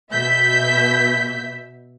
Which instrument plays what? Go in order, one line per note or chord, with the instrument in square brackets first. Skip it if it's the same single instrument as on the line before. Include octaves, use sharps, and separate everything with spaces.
[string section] B2 E5 G6 B6